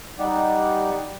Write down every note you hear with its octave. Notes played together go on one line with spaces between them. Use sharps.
G3 D#4 G4 D5 F#5